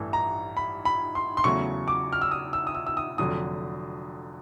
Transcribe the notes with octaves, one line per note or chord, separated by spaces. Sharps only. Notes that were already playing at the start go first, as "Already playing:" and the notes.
Already playing: A1 G2 E3 A3
A#5
B5
B5
C6
C6
E2 C#3 F#3 A3 C#6
D6
F6
E6
D#6
E6
D#6
E6
E6
D#6
F1 F2 D3 F#3 D#6